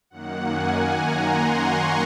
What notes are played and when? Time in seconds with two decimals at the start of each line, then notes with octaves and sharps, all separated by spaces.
0.10 F#2 D#3 A#3 F#5
0.47 G#5
0.83 A#5
1.20 C6
1.57 C#6